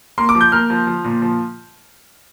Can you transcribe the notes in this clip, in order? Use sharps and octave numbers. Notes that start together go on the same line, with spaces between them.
A#3 C6
D6
F3
G6
A#3 F6
F3
F3
A#2
F3